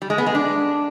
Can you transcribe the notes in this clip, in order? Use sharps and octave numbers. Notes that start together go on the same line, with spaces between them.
G3
G#3
B3
G#3
D4